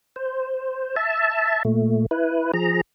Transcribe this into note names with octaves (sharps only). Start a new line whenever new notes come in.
C5
E5 A5
A#2 A3
E4 B4
F3 G#4 A#5